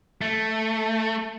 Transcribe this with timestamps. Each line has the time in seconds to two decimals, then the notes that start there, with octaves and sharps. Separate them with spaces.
0.22 A3